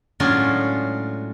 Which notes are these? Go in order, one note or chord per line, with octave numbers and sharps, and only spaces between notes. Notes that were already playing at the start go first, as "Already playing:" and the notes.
A2 F#3 G#3 C#4 D4 F4